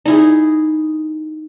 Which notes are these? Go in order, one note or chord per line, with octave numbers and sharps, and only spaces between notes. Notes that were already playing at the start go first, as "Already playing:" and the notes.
D#4 E4 G#4